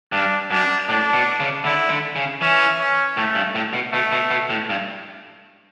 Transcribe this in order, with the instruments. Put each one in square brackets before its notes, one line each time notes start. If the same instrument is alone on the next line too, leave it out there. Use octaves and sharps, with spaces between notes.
[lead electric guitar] G2 [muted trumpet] D4
[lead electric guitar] F#2 [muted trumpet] D4
[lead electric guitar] A2 [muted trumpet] D4
[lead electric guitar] B2
C#3
[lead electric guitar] D3 [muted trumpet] E4
[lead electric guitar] D3
C#3
[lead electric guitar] E3 [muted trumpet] C#4
[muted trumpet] C#4
[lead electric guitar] A2 [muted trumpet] A3
[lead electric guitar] G2
A2
B2
[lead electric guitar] B2 [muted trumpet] A3
[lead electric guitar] B2
B2
A2
G2